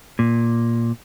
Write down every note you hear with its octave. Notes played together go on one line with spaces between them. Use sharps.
A#2